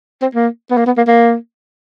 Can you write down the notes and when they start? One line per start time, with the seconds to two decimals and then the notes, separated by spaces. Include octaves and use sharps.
0.22 C4
0.35 A#3
0.70 B3
0.77 A#3
0.86 B3
0.97 A#3
1.07 A#3